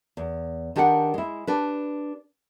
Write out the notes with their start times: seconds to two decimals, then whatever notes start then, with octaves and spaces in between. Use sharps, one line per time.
0.17 E2
0.76 D#3 D4 G4 B4 F5 F#5
1.14 G#3 E4
1.47 D4 G4 B4